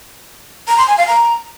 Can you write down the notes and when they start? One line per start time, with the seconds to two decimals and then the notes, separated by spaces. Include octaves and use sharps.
0.68 A#5
0.78 C6
0.88 G#5
0.98 F5
1.07 A#5